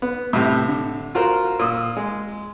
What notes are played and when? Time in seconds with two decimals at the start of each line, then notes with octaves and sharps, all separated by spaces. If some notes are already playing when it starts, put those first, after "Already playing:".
0.02 B3
0.33 A2 C3
0.68 D3
1.15 F4 F#4 A#4 C5
1.59 A#2 D#6 E6
1.97 G#3